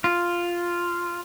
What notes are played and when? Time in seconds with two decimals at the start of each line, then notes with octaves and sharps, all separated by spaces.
0.04 F4